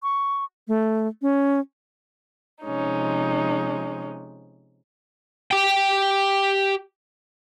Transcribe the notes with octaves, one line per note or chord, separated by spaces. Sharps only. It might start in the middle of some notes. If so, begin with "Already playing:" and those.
C#6
A3
C#4
C3 F3 G#3 C#4 D#4
G4 G5